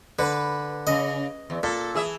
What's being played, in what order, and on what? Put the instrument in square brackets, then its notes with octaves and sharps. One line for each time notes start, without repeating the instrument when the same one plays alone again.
[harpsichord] D3 [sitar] B4
[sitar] C#3 [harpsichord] D#5
[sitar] E2
[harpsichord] A#2 [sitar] A4
[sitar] E3 G#4 E5